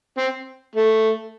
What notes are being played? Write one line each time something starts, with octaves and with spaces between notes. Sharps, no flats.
C4
A3